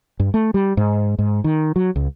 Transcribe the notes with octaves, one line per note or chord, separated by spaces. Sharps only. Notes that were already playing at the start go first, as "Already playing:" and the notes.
G2
A3
G3
G#2
G#2
D#3
F#3
C#2